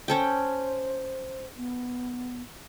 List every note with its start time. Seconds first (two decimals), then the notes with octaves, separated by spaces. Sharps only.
0.08 C#4 A4 C5 G5
1.57 B3